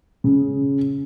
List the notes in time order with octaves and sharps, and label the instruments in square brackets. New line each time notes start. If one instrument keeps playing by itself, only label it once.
[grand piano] C#3